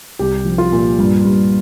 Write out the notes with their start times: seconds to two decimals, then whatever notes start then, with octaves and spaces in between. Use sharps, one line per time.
0.19 C2 G4
0.45 F3
0.58 F4
0.72 A#2
0.99 G2
1.25 G2